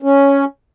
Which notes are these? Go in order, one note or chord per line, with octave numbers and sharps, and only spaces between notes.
C#4